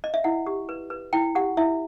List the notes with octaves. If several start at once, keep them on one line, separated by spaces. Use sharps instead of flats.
D#5
E5
E4 F#5
G4
B4
B4
E4 G5
G4 F#5
E4 E5